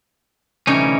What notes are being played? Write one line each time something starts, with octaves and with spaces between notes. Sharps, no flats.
D2 C3 E3 G3 C#4 D#4